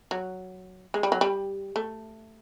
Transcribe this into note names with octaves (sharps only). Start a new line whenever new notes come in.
F#3
G#3
G3
F#3
G3
A3